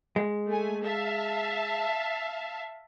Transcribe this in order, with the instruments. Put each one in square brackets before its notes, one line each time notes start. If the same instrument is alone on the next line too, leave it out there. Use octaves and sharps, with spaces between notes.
[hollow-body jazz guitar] G#3
[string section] A3 G#5
E5 F5 A5